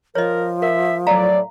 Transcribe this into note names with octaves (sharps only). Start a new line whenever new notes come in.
F3 A#4 C#5 D#5
A#4 E5
A2 F#3 A3 D5 F5 A#5